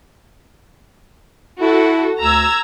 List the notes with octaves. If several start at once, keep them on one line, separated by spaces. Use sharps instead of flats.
E4 F#4 A4
D2 A#5 E6 G#6